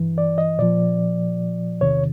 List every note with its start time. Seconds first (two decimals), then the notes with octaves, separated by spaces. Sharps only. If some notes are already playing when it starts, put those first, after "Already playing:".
Already playing: G2 E3
0.18 D5
0.38 D#5
0.58 A#2 F3 D5
1.81 E2 C3 D#3 C#5